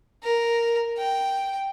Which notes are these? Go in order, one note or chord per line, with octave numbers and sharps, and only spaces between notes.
A#4
G5